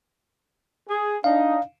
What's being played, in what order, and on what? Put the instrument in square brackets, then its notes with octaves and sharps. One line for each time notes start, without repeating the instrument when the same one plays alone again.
[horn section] G#4
[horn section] D4 D#4 [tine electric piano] F5